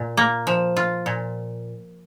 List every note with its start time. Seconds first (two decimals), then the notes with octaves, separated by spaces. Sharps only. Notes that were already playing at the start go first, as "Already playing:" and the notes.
Already playing: A#2
0.17 A#3
0.47 F3
0.77 F4
1.06 A#2